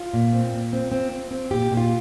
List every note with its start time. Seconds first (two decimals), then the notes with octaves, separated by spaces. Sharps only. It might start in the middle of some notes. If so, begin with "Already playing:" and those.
Already playing: F4
0.14 A#2
0.33 C4
0.53 A#2
0.73 C4
0.92 C4
1.11 C4
1.31 C4
1.51 A#2 G4
1.71 A#2
1.77 F4